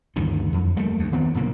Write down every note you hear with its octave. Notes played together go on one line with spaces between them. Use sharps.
D2 G2 D#3 E3
F2
G3 A3 A#3
D2
D#3 B3 C4
F#1 A#2 A#3